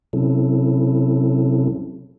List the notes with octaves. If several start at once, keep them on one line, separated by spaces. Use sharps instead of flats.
C3 F#3 C4 C#4 E4 A4